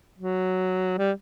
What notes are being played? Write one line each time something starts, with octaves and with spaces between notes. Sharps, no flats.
F#3
G3